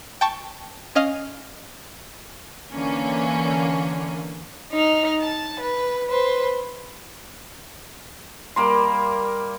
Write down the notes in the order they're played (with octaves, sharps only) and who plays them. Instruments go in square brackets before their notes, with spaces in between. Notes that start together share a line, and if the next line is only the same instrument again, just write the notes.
[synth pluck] G5 A5 C#6
C#4 D#5 F5 F6
[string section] D3 E3 A#3 C#4
[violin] D#4 F6
A5
B4
B4 C5
[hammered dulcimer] G3 A#3 C6